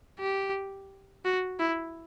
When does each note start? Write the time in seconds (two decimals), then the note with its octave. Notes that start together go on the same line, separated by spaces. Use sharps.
0.19 G4
1.25 F#4
1.59 E4